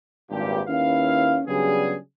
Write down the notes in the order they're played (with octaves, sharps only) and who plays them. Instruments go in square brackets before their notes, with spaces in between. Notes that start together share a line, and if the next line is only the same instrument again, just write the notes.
[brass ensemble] G#1 G2 A#2 G4
D#2 C#4 E4 B4 F5
C#3 F#3 G3 B3 D4 G#4